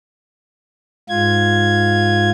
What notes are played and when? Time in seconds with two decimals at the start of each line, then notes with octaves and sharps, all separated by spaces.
1.09 G#2 F4 G#6